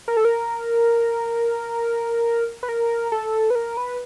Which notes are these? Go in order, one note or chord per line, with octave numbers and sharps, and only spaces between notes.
A#4
A4
A#4
B4
A#4
A4
B4
A#4
B4